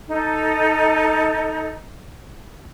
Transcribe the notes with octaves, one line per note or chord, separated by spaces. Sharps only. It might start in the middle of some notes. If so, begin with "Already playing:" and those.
D#4 A4